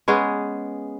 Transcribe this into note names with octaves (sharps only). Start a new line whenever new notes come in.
G#3 B3 C#4 G#4